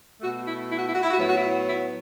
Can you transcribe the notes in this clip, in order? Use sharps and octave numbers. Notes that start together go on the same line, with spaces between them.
B2 A3 F#4
E4
E4
F#4
E4
F#4
E4
F#4
A2 F#3 B3 E4
F#4
E4
E4